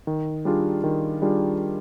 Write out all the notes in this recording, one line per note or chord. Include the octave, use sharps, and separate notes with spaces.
D#3
G3 D4 F4 G#4
D#3
G3 D4 F4 G#4